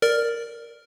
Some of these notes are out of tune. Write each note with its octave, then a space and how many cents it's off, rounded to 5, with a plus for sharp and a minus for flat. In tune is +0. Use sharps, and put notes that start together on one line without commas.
A#4 +0 D5 +0